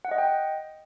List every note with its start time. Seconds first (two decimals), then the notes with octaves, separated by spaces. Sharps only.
0.05 F#5
0.11 D#5
0.18 G5